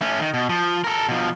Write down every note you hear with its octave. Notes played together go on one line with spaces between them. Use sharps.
A3 C#4
D#3
B2
F3
A4 A#4
B2 F3